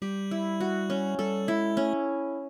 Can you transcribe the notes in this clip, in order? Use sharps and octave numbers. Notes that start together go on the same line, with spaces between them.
G3 G4
E4
F#4
C#4
G3 A4
G#3 E4
A3 C#4